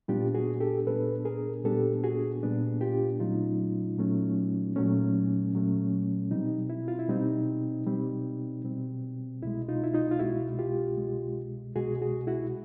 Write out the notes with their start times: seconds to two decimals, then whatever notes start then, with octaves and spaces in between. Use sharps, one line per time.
0.08 A#2 G3 B3 D4 F4 G4
0.34 F#4 G#4
0.60 G4 A4
0.87 A#2 G3 B3 D4 A4 B4
1.25 G#4 A#4
1.64 A#2 G3 B3 D4 G4 A4
2.04 F#4 G#4
2.43 A#2 G3 B3 D4
2.81 F4 G4
3.20 A#2 F#3 A3 C#4 D#4 F4
3.98 A#2 F#3 A3 C#4
4.76 A#2 F#3 A3 C#4
5.53 A#2 F#3 A3 C#4
6.31 B2 G3 C4 D#4
6.70 E4
6.88 F4
6.99 E4
7.09 B2 G3 C4 D#4
7.87 B2 G3 C4
8.64 B2 G3 C4
9.42 C2 B2 G#3 E4
9.69 D#4 F4
9.83 E4
9.94 D#4 F4
10.11 F4
10.19 C2 B2 G#3 E4 F#4
10.59 F4 G4
10.98 C2 B2 G#3
11.75 C2 B2 G#3 F#4 G#4
12.02 F#4 G#4
12.27 E4 F#4